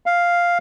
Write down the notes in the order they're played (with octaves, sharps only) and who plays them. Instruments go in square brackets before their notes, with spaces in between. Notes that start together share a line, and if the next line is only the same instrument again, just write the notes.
[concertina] F5